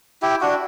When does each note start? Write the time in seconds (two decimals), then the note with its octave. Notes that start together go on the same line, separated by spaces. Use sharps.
0.22 E4 G4
0.41 D4 F#4